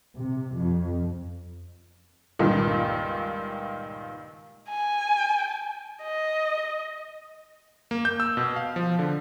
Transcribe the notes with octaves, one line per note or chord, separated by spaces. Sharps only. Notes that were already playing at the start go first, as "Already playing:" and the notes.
C3
F2
C#2 G2 A#2 D#3
G#5
D#5
A#3
G6
E6
B2
F5
F3
D3